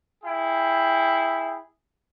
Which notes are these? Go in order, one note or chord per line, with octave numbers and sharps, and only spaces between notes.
E4 G#4 G5